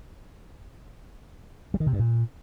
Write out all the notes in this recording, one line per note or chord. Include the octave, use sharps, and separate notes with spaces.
G3
D#3
C3
G2
A#2